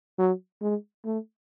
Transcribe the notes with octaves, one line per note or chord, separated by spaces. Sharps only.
F#3
G#3
A3